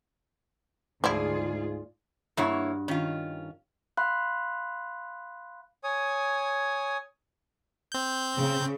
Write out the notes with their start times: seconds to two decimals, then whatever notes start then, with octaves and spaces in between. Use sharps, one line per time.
1.04 D2 G#2 F3 E4 F4 G#4 D5
2.37 G2 A#3 E4 F#4 C#5
2.88 D#3 C#4 F4
3.97 F5 B5 C6 F#6
5.84 C#5 G#5 D#6
7.92 C4 G6
8.38 C#3